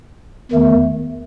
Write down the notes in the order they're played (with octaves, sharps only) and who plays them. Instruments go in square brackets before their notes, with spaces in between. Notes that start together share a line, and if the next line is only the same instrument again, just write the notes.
[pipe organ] E2 D#3 A3